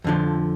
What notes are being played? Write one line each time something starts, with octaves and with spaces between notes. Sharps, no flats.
F2 D3 F3